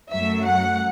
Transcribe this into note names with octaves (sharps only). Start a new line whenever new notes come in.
F#2 F#3 A3 E5
F#5